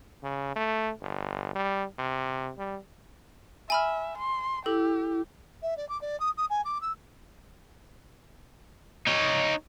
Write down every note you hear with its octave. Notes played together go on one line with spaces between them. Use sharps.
C#3
A3
G1
G3
C3
G3
E5 G#5 B5 F6
C6
E4 G4 A4
E5
D5
D6
D5
D#6
D#6
G#5
D6
E6
D#4 C#5